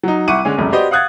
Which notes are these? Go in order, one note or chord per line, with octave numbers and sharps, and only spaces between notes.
F#3 D#4
C2 E4 F#5 C#6 D6 D#7
D3 G#3 C#4
F1 C#2 F#2
F#4 G4 B4 C5 D5 D#5
F5 F#5 D#6 F#6 G#6 A6